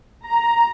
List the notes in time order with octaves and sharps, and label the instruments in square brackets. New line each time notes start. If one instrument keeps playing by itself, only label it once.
[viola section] A#5